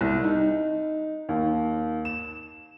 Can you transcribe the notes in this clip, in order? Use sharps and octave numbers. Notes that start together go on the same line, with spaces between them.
C2
D#4
D#2
E7